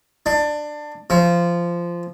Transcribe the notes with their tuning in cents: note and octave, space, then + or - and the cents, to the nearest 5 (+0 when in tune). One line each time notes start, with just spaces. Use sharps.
D4 +20
F3 -15